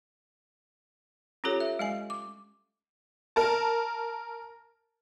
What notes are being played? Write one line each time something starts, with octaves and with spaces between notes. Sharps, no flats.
C#4 F4 G4 A4 C#5
E5
G#3 D#5 G#5
D6
A#4 A5